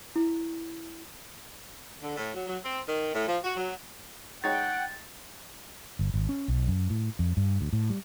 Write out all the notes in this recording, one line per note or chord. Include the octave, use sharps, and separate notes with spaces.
E4
D3
A2
F#3
F#3
C4
D#3
A2
F3
F#4
F#3
G#3 D#4 C#5 F#5 G5 A6
G1
G#1
C#4
B1
F#2
A2
F2
G2
D2
A2
G3